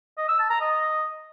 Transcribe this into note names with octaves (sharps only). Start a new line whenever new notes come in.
D#5
E6
A5
A#5
D#5